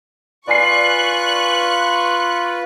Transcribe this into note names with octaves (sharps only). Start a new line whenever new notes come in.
F4 B4 D5 G#5 C#6 F#6 C7